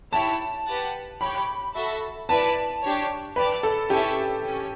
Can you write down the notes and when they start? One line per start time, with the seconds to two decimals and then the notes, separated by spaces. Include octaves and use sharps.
0.13 E4 G4 C#5 A5
0.66 G4 B4 F#5 A5
1.20 G4 C#5 G5 B5
1.75 F#4 A4 E5 A5
2.29 E4 B4 D5 A5
2.83 D4 G4 C#5
3.36 G4 B4 D5 A5
3.63 A4
3.90 C#4 E4 G4 A4 C#5 E5
4.45 C#4